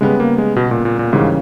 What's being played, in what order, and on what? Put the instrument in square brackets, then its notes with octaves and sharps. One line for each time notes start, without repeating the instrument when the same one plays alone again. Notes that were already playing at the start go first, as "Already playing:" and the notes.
[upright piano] C#3 G3 B3 [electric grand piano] G#3
[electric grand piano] A#3
G#3
B2
A#2
A#2
A#2
[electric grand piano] G#2 [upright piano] C#3 E3 G3 A#3 C#4